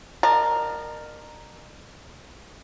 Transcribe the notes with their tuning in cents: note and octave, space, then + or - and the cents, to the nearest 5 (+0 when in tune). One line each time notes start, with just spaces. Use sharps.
A#4 +0 D#5 -45 A5 +0